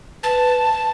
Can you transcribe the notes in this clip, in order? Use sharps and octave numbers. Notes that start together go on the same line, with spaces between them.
B4 A5